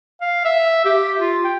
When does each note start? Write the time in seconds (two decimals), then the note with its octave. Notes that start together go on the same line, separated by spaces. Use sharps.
0.21 F5
0.45 E5
0.85 G4
1.20 F4
1.44 G5